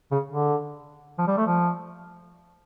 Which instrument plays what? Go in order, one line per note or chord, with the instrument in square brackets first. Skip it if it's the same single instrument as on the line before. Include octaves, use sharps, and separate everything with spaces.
[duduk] C#3
D3
F3
G3
A3
F3